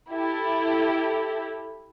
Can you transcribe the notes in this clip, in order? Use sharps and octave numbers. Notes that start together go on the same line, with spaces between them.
E4 G4 A4